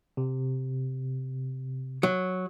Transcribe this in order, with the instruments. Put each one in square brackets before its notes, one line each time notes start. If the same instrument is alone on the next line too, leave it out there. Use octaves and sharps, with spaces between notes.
[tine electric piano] C3
[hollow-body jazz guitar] F#3